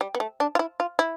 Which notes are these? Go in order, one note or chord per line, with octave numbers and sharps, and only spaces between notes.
G3
B3
A3
D4
F4
E4
F4
E4